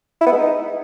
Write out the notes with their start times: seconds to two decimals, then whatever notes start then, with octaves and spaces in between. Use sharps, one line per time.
0.21 E4
0.27 B3
0.32 G#3
0.38 D#4